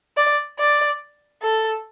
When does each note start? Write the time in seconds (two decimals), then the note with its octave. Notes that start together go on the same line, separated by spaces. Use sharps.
0.17 D5
0.59 D5
1.42 A4